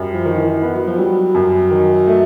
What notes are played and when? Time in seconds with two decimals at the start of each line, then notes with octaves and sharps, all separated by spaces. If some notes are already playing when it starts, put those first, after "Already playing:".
Already playing: F#2 G3
0.14 F3
0.25 D#3
0.33 F3
0.38 E3
0.62 B3
0.74 F#3
0.87 F3
0.99 F#3 G3
1.35 F#2
1.71 D#3
2.07 A3